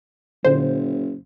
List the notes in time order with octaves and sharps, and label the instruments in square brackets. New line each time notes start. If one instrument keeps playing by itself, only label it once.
[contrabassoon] F#1 [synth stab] A#2 D3 C5